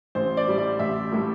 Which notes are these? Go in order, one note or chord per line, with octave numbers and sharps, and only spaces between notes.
A1 C5
D5
A2 G3
D5
A1 E5
A2 G3